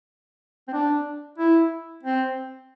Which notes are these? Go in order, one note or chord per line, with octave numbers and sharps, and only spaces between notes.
C4
D4
E4
C4